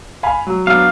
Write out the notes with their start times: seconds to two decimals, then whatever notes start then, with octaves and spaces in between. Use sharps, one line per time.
0.23 F5 G#5 B5
0.47 F#3
0.67 F#3 B3 D4 F5